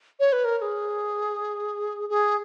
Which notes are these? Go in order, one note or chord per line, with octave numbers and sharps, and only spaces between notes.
C#5
B4
A#4
A#4
G#4
G#4